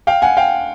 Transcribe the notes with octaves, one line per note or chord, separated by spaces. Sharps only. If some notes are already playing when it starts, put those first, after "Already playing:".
F5 G5
F#5 G#5
F5 G5